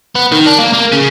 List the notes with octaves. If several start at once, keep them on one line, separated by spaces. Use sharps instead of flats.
B3
D#3
D4
A#3
A#3
C#3